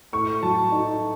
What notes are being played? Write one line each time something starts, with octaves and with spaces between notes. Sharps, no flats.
A2 C#6
F#3 A5
D#4